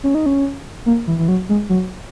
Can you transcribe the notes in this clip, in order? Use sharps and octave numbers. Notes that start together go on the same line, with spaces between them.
C#4
D#4
C#4
A#3
E3
E3
F#3
G#3
F#3